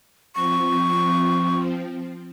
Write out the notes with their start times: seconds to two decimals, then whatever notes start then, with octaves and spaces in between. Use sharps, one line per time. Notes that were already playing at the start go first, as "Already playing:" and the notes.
0.35 F3 C4 C#6